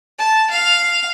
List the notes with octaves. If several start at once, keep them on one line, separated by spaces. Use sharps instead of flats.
A5
F5